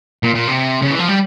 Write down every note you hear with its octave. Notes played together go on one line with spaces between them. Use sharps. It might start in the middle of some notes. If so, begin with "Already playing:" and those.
A#2
A#2
C3
C#3
E3
F3
G3